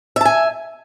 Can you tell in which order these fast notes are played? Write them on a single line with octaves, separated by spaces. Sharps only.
E5 A5 G#5